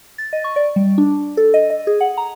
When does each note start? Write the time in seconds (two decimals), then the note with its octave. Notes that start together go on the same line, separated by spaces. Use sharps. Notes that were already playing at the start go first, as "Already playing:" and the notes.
0.18 A6
0.33 D#5
0.44 C#6
0.56 D5
0.76 G3
0.98 D4
1.37 A4
1.54 D#5
1.70 D#5
1.87 G#4
2.01 F#5
2.18 A#5